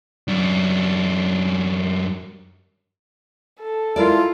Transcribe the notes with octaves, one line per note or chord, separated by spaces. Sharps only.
F#2 D4
A4
G#3 E4 F4 A#4 D5